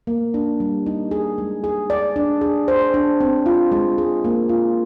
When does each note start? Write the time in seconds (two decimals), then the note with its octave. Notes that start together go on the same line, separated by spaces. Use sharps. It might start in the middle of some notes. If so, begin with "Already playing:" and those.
0.07 A#3
0.34 D4
0.60 G3
0.86 D#4
1.11 G#4
1.38 G#3
1.64 G#4
1.90 D5
2.16 D4
2.41 G#4
2.68 C5
2.94 D4
3.20 C4
3.46 F4
3.72 G#3
3.98 G#4
4.25 A#3
4.49 F4